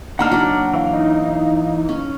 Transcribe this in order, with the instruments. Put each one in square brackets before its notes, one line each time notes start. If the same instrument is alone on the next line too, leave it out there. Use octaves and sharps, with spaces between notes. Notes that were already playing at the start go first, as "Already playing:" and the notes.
[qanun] A#3 D4 D#4 [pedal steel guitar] F#5 A#5 F6
[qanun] F#3 D5
[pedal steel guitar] E3 F5
[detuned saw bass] D#4
[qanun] C#4